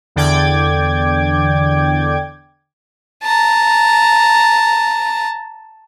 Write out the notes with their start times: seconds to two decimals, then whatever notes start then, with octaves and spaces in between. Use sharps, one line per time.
0.16 E2 D3 D5 G5 D6 G#6
3.23 A5 A#5